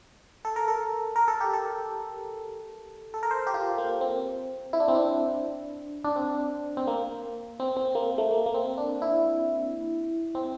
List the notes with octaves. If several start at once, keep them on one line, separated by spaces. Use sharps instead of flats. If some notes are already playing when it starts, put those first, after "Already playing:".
A4
A#4
A4
A#4
A4
G4
A4
A4
A#4
C5
G4
F4
A#3
C4
E4
D4
C4
D4
D4
C4
C4
A#3
C4
C4
A#3
A3
A#3
A#3
C4
D4
E4
C4